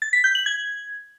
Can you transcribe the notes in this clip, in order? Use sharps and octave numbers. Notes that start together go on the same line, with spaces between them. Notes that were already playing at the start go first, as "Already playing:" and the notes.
A6
B6
G6
F#7
G#6